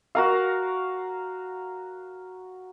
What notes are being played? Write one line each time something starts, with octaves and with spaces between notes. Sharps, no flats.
F#4 A#4 F5